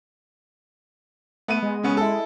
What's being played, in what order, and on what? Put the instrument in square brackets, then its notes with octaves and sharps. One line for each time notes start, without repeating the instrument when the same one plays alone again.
[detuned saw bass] A3 [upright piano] B3 D#7
[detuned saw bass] G#3
[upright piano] C#3 B3 C#4
E4 A4